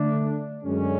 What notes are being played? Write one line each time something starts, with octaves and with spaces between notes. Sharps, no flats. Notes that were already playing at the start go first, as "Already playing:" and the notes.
Already playing: D3 A3 D4
F#2 D3 G#3 C#4